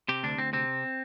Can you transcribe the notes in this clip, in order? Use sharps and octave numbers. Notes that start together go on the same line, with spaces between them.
C3 G4
D2 D4
D2 C4
C3 C4